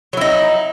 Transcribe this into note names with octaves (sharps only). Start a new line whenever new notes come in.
F#3 D#4 E4